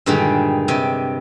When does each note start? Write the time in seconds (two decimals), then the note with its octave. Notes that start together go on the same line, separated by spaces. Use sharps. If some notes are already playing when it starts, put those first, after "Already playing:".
0.06 G2 A#2 D3 D#3 G3 G#3
0.68 G2 C3 G4 D#5